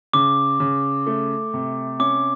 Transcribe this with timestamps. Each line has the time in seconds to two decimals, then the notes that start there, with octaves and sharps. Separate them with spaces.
0.13 C#3 D6
0.60 C#3
1.07 A3
1.54 C3
1.99 C#4 D6